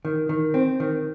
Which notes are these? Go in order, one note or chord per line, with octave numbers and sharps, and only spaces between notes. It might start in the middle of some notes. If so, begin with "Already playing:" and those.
D#3
D#3
C4
D#3